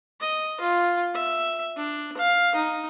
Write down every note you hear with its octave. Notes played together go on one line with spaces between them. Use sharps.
D#5
F4
E5
D4
F5
D#4